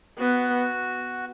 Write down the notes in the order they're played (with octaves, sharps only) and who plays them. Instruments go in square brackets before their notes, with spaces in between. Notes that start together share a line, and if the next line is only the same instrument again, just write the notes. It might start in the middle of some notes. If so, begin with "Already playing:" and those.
[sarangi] B3 [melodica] F#4